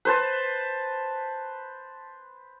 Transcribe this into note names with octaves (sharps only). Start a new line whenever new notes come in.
B4 C5 A5